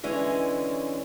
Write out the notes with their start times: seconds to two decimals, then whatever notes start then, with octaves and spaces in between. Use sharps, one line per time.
0.03 D3 E3 G#3 C#4